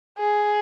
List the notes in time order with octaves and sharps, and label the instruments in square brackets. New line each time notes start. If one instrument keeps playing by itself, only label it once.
[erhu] G#4